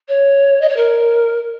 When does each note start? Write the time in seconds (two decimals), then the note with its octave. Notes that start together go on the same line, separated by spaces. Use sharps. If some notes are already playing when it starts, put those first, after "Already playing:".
0.08 C#5
0.61 D#5
0.69 C#5
0.76 A#4